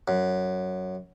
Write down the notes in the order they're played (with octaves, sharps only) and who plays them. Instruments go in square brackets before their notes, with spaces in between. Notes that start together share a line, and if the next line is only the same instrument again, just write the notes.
[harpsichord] F#2